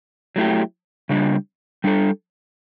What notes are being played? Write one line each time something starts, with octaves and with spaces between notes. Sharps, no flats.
F#3 A3 E4 G4
C#3 G3 D4
G3 D4 A4